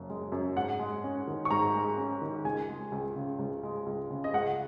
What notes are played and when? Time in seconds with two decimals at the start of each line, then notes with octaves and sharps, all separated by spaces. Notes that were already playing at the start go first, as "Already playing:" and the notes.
Already playing: F#1 F#2 C#3
0.09 G#3
0.32 F#2
0.56 G#2 F#5
0.79 G#3
1.04 C#4
1.27 D#3
1.45 C#6
1.50 G#2 A#5
1.74 G#3
1.98 C#4
2.22 D#3
2.44 C#2 G#5
2.69 G#3
2.92 C#2
3.16 C#3
3.39 C#2
3.63 G#3
3.86 C#2
4.10 C#3
4.24 D#5
4.33 C#2 F#5